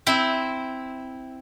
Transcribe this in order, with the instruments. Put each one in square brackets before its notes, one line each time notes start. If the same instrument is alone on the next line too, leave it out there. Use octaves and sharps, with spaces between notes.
[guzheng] C4 E4